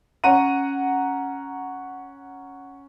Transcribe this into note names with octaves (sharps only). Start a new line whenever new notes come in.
C#4 F#5 A#5 D#7